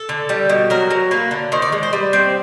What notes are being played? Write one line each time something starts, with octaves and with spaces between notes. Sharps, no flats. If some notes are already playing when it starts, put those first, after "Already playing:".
Already playing: A4
D3
G3
B2
F#3 A#4
F#3
A#3 B4
D3
D#3 C5
D5
G#3
C5
G3 B4
C4